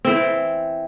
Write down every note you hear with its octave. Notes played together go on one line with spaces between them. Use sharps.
E3 C4